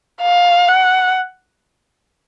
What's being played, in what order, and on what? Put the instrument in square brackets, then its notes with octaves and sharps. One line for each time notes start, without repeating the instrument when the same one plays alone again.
[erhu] F5
F#5